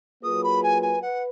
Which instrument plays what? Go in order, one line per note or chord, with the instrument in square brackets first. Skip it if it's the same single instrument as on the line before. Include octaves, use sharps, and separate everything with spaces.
[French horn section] F#3 A#3 F4 G#4 B4 [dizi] D#6
[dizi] B5
G#5
G#5
[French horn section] B4 [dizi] F#5